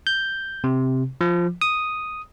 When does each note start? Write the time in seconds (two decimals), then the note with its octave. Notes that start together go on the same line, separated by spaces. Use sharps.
0.07 G6
0.64 C3
1.21 F3
1.61 D#6